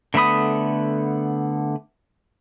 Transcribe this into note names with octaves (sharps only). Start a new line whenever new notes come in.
D3 A3 B3 B5 D#6